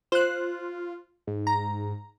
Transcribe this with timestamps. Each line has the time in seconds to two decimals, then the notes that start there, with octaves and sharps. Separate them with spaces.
0.12 F4 C5 F#6
1.27 G#2
1.47 A#5